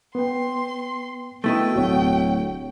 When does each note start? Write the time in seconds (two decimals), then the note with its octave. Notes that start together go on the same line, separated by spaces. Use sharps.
0.15 B3 G5 C6
1.44 B2 A3 E4 D#5 G5 E6
1.75 D1 F#4 C#5 F#5